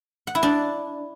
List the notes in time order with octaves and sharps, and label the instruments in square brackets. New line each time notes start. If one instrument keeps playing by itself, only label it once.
[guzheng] F#5
E4
D4